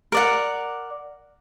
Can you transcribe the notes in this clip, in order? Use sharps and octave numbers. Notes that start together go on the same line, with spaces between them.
A#4 D5 F#5